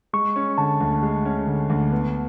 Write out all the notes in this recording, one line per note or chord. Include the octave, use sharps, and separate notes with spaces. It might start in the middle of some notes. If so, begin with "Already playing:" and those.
G#3 C#6
C#4
D3 A5
D2
G#3
C#4
D3
D2
B3